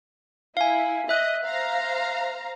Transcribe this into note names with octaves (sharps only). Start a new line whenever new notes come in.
E4 F5 G#5
D#5 E5 F#6
C5 F5 A#5